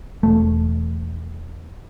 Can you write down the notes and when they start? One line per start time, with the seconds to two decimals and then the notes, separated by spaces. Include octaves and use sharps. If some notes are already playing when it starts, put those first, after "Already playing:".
0.23 E1 A3